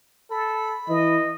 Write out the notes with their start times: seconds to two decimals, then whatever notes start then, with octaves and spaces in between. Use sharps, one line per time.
0.31 A4 B5
0.89 E3 D#5